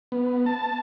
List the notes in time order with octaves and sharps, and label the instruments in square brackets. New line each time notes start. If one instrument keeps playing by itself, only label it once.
[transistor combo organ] B3
A5